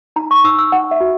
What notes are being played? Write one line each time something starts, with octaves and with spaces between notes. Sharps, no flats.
D#4 A#5
C#6
D#4 E6
E6
D#4 F#5
E5
F#4